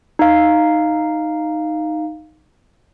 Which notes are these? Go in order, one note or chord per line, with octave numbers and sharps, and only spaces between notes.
D#4 F5